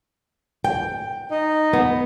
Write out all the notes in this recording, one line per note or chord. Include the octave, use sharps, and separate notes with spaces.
G5
D#4 D#5
B3